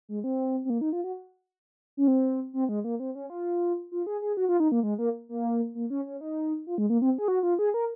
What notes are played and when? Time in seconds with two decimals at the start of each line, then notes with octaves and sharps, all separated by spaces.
0.09 G#3
0.24 C4
0.65 C4
0.70 A#3
0.81 D#4
0.93 F4
1.04 F#4
1.97 C#4
2.08 C4
2.53 C4
2.69 G#3
2.84 A#3
3.00 C4
3.15 C#4
3.30 F4
3.92 F4
4.07 G#4
4.22 G#4
4.37 F#4
4.49 F4
4.60 D#4
4.72 A#3
4.83 G#3
4.98 A#3
5.29 A#3
5.75 A#3
5.90 C#4
6.06 C#4
6.21 D#4
6.67 F4
6.78 G#3
6.90 A#3
7.02 C4
7.18 G#4
7.28 F#4
7.43 F4
7.59 G#4
7.74 A#4